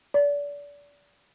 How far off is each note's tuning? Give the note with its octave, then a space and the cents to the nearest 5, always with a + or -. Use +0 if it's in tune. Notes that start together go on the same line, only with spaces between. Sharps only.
D5 -30